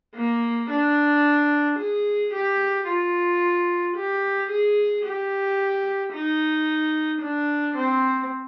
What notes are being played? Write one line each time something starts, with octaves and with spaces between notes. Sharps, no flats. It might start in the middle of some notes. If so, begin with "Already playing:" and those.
A#3
D4
G#4
G4
F4
G4
G#4
G4
D#4
D4
C4